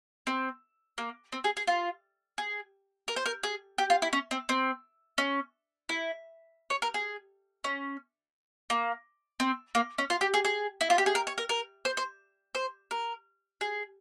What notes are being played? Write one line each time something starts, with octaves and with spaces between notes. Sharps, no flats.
C4
A#3
C4
G#4
G#4
F4
G#4
A#4
C5
A#4
G#4
G4
F4
E4
C#4
C4
C4
C#4
E4
C#5
A#4
G#4
C#4
A#3
C4
A#3
C#4
F4
G4
G#4
G#4
E4
F4
G4
G#4
A#4
C#5
A#4
A#4
C5
C5
C5
A#4
G#4